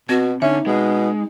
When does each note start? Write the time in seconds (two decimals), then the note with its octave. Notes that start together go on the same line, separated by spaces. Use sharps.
0.09 B2 C4 F#4
0.42 D3 C#4 D#4 E5
0.67 B2 G#3